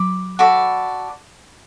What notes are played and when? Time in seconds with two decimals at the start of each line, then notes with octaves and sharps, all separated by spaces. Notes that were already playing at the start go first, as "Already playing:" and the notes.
Already playing: F#3 B5 D6
0.39 F#4 A4 D5 B5